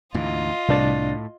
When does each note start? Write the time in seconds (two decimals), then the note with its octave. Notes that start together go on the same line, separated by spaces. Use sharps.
0.14 D2 G#2 E3 F4 D#5
0.69 C2 A2 D4 A6